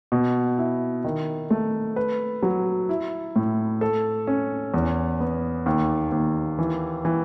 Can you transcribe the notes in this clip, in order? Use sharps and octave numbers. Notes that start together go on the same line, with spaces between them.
B2
E4
D#3
A3
B4
F#3
E4
A2
A4
C#4
E2
B3
D#2
D#2
E3
E3